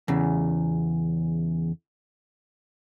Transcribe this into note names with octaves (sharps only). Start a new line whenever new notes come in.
E2 C#3